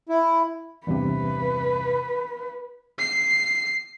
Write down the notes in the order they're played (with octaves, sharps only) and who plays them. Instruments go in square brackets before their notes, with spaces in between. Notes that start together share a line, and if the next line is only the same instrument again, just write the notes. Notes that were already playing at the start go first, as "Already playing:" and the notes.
[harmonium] E4
[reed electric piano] E2 G2 C3 [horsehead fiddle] B4
[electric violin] C7